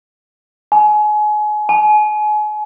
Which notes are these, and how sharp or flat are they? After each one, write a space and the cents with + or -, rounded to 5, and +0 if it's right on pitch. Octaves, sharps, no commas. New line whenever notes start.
G#5 +30
G#5 +35